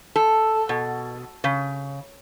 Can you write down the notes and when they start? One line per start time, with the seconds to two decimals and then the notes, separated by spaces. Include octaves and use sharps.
0.16 A4
0.69 B2
1.44 C#3